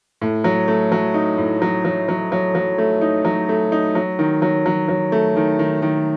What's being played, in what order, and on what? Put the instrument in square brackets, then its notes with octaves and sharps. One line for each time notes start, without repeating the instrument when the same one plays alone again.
[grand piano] A2
F#3
A3
F#3
D#4
A2
F#3
F#3
F#3
F#3
F#3
A3
D#4
F#3
A3
D#4
F#3
D#3
F#3
F#3
F#3
A3
D#3
D#3
D#3